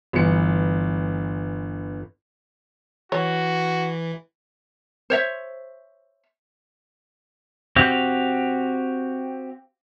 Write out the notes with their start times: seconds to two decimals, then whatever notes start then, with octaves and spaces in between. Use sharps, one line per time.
0.13 G1 E3 C#7
3.12 E3 F#4 C#5
5.10 C5 C#5 E5
7.76 C4 F#4 G4 F5